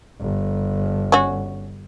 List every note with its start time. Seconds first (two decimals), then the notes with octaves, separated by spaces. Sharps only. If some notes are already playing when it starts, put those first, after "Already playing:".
0.21 G1
1.12 C#4 F#4